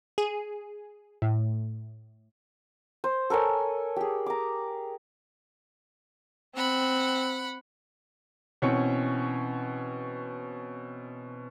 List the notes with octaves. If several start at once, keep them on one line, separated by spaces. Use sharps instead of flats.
G#4
A2
C5
A4 A#4 C#5 G#5
G4 G#4
A#5 D6
C4 F#5 B5
B2 E3 C4 C#4 C#5 C#7